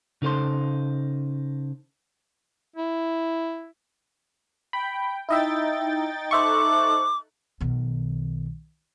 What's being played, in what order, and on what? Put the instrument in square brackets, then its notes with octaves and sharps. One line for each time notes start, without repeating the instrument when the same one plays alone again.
[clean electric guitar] C#3 D#4 A4 C5 C6
[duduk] E4
[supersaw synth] G5 [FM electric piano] B5
[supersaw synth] D#4 G5 A6 [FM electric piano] E4 D#5 E5
[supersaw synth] D#4 A4 F#6 [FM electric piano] C5 E5 C#6 [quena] D6
[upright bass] B1 D#3